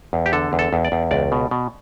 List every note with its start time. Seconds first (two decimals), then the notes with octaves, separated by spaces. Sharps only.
0.13 E2
0.26 G4
0.33 D3 A4
0.53 E2
0.59 A4
0.73 E2
0.85 D5
0.92 E2
1.11 C#2 D5
1.32 B2
1.51 B2